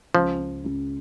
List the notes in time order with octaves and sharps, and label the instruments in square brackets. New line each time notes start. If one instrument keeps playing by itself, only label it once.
[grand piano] C#2 [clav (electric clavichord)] F3
[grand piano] C#2
C#2